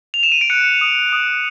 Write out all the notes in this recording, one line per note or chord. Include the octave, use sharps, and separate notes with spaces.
F7
E7
D#7
D7
F#6 C#7
D#6
D#6